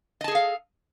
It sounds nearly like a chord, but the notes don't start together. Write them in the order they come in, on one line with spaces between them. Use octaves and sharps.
D#5 A5 G#4 A4 F5